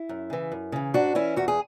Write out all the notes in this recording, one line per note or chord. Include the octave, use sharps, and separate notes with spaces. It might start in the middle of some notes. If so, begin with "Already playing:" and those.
Already playing: E4
F#2
C#3 E3
F#2
C#3 E3
G#2 D4 F#4
E3 C#4 E4
E2 F#4
G#4